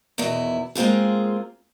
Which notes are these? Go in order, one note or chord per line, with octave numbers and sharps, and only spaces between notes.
E2 B2 D#3 E4
G#3 A#3 C4 F4 G#4